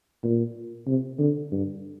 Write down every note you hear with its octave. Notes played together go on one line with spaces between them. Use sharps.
A#2
C3
D3
G2